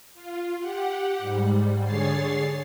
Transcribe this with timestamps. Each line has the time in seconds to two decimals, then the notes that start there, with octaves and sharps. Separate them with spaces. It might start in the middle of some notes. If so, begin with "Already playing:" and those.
0.15 F4
0.60 G4 F#5
1.19 G#2 G3
1.84 D3 G#4 C#5 A6 C7